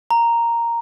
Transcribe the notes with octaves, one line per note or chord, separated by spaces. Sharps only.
A#5